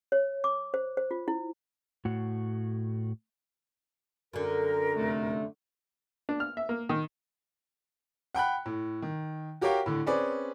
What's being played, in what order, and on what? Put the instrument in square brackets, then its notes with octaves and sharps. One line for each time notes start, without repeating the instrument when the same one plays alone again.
[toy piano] C#5
D6
C5
C5
F4
E4
[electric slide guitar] A2 F#4
[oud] F#2 D3 [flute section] A#4
[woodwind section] F2 C3 A3
[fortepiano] D4
F6
E5
A#3
D#3
[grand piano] F#5 G5 B5 F#6
A2
D#3
F#4 G4 A#4 C#5 F5 G5
A2 D3
C4 C#4 G#4 B4 D5